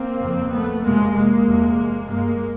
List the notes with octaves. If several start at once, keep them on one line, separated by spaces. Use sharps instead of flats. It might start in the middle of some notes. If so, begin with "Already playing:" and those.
Already playing: A#3 C4
F2 C#3
A3 B3
F2 C3 G#3 A#3
G#3 A#3
E2 C3
G2 G#3 A#3